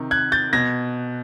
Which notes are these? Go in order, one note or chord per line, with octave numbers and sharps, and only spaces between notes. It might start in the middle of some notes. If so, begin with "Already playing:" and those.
Already playing: C3 D#3
F#6 G#6
G6 A6
B2 G#6 A#6